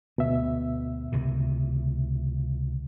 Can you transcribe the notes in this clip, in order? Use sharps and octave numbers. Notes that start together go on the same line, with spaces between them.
D2 B2 E5
C#2 C3 D#3